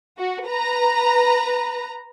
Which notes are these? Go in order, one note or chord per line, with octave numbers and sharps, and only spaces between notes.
F#4
B4 A#5